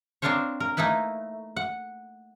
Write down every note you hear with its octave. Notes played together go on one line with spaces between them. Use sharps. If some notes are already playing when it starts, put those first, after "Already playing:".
C4 D4 F4 A#4 C5 C#5
A#4
A3 A#3 D#4 E4 B4
F#5